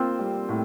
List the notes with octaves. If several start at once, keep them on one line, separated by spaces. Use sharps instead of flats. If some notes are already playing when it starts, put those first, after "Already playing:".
Already playing: A#3 C4 F4
G3
A2